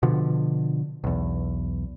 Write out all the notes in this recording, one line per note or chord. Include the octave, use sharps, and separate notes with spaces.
B2 D3 F3
B1 E2